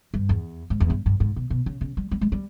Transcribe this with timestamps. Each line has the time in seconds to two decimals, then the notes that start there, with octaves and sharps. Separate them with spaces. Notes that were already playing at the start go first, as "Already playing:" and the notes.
0.14 G2
0.29 E2
0.70 G#2
0.80 E2
0.90 G2
1.06 G2
1.20 G#2
1.36 B2
1.50 B2
1.66 C#3
1.81 C#3
1.97 G3
2.11 G3
2.21 G#3
2.32 G3